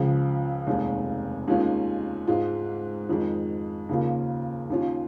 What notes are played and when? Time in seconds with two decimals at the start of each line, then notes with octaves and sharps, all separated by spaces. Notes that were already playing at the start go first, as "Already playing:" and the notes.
Already playing: C#2 C#3 F3
0.67 F1 D#2 D#3 G#3
1.48 D#2 D#3 G#3 C#4 F4
2.27 G#2 G#3 F4
3.09 F2 D#3 G#3
3.89 D#2 C#3 A#3 F4
4.70 D#2 D#3 C#4 F4